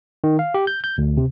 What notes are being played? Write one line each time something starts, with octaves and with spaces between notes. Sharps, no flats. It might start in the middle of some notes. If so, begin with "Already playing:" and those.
D#3
F5
G4
G6
G6
D2
C3